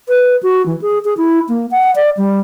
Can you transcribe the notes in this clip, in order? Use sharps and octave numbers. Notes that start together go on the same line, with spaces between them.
B4
F#4
E3
G#4
G#4
E4
A#3
F#5
D5
G3